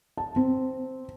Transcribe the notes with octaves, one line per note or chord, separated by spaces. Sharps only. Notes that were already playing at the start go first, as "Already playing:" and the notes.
A5
C4